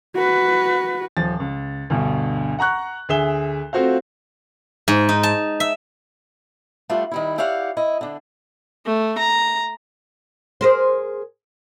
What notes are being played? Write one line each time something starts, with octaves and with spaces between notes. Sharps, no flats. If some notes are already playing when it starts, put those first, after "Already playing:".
F#4 B4
D#1 F3 A6
C#2
D2 G2 B2
F#5 A#5 C#6 F#6
D2 G#4 E5 E7 G7
A3 C4 F4 F#4 C5 F5
G#2
D#4
A5
E5
G3 A3 D4 F4 F#4
D#3 G3 E4
E4 G4 C#5 D5 F5 F#5
E4 D#5
D3 D4
A3
A#5
G#4 A#4 C5